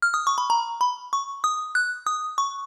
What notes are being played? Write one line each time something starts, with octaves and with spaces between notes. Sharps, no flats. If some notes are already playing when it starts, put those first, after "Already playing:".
F6
D#6
C#6
B5
A#5
B5
C#6
D#6
F#6
D#6
C#6